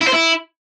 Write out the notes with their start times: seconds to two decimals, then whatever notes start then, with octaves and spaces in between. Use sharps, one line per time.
0.01 E4
0.07 C5
0.13 E4